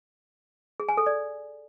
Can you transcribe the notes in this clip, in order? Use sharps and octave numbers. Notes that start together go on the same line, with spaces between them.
G#4
G#5
A4
D5